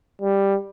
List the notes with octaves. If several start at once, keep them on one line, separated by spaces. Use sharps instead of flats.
G3